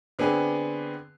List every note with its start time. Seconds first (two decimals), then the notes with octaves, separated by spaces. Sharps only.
0.19 D3 B3 C4 G#4 B4